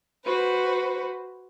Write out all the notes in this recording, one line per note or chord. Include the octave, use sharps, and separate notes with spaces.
F#4 B4 C5